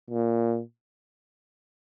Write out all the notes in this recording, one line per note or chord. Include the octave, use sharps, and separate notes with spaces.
A#2